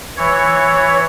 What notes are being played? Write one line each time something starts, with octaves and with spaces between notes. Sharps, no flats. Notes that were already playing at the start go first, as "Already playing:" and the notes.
E3 C#5